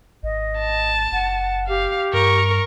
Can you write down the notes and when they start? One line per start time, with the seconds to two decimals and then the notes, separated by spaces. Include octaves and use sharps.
0.23 G#1 D#5
0.59 A5
1.12 F#1 F#5
1.68 G4 F5
2.13 G2 A#4 C#6